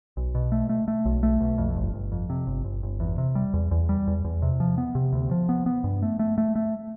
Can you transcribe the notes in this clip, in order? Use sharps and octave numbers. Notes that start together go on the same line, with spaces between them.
B1
B2
A3
A3
A3
B1
A3
B1
F2
G1
G1
F2
C3
G1
G1
G1
E2
C3
G3
E2
E2
G3
E2
E2
C3
F3
B3
C3
D2
F3
B3
B3
G2
A3
A3
A3
A3